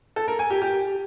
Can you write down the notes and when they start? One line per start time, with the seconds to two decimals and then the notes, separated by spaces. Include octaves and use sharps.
0.16 A4
0.28 A#4
0.39 G#5
0.50 G4
0.62 G4